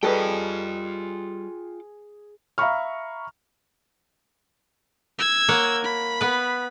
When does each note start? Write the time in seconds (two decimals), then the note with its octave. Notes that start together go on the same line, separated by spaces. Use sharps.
0.03 G3 D#4 F4 G#4 A4 B4 G5
2.58 E5 F5 A#5 B5 C#6 F6
5.19 E6 G#6
5.49 A#3 C#5 F#5
5.84 B5
6.21 B3 B4